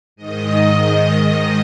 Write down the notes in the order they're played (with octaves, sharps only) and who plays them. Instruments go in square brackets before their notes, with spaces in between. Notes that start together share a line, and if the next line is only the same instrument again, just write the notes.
[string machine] G#2 D#3 D#5